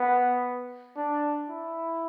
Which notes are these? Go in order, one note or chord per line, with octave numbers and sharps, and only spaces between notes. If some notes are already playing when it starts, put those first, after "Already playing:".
Already playing: B3
D4
E4